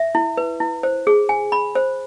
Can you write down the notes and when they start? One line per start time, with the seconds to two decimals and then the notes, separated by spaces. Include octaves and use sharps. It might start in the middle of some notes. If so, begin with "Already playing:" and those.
Already playing: E5
0.15 E4
0.37 B4
0.60 E4
0.83 C5
1.07 G#4
1.29 G#5
1.52 B5
1.75 C5